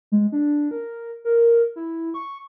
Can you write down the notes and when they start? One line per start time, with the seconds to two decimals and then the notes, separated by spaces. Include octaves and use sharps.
0.12 G#3
0.32 D4
0.71 A#4
1.25 A#4
1.76 E4
2.14 C#6